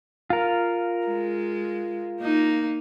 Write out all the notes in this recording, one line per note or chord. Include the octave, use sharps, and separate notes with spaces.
F4 A#4
G#3
A#3 D#4